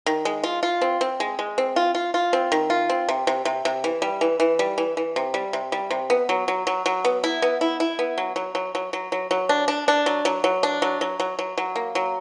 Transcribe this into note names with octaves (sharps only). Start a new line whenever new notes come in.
D#3
G#3
F4
F4
C4
C4
G#3
G#3
C4
F4
F4
F4
C4
D#3
F4
C4
C3
C3
C3
C3
E3
G3
E3
E3
G3
E3
E3
C3
G3
C3
G3
C3
B3
F#3
F#3
F#3
F#3
B3
E4
B3
E4
E4
B3
F#3
F#3
F#3
F#3
F#3
F#3
F#3
D4
D4
D4
F#3
F#3
F#3
D4
F#3
F#3
F#3
F#3
F#3
A#3
F#3